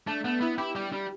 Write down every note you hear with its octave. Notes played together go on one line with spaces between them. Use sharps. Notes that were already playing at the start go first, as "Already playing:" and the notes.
A3 D4
A3 B3
B3 E4
E4 G4
G3 G4
G3